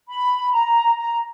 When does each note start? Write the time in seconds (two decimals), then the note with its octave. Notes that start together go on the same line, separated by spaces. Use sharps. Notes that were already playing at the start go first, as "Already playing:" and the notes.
0.09 B5
0.53 A#5
0.97 A#5